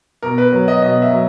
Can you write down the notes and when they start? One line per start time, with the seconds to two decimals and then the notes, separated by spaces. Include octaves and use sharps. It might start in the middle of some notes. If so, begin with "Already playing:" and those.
0.23 B2 A#4
0.38 B4
0.52 F#3
0.68 D#5
0.82 B2 D#5
1.02 E5
1.11 F#3